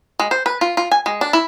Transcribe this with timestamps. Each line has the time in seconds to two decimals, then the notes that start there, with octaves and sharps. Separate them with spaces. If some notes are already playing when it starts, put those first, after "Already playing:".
0.19 G#3
0.31 C5
0.46 B4
0.61 F4
0.77 F4
0.91 G#5
1.06 G#3
1.21 D4
1.33 E4